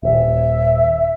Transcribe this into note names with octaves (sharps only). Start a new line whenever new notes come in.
D#1 E5